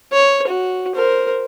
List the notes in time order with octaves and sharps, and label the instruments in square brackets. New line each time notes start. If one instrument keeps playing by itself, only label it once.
[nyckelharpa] C#5
F#4
A#4 C5